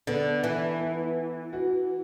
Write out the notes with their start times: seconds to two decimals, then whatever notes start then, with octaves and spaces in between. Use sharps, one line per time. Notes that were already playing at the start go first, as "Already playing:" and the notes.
0.07 D3 B3
0.44 E3
0.81 B3
1.53 F#4